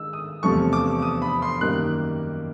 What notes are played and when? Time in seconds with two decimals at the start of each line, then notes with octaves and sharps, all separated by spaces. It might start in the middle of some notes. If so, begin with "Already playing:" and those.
Already playing: D#3 G#3 E6
0.13 D#6
0.43 E2 C3 F3 A3 C#6
0.73 D6
1.02 D#6
1.22 B5
1.42 C6
1.61 F#2 D#3 G3 A#3 F#6